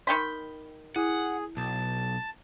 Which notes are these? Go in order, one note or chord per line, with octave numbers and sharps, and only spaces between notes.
D#3 G5 B5 C6
E4 G#4 F#5
B1 A5